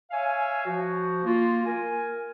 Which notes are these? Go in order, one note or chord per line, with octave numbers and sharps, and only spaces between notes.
C#5 E5 F5 G#5
F3 F#4
A#3 F4
A#4 G#5